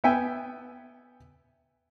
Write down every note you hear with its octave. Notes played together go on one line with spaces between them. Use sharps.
B3 E5 G5 G#5